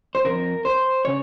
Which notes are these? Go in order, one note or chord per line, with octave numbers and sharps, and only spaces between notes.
C5
F2 C#3 A#4
C5
C#3 C#5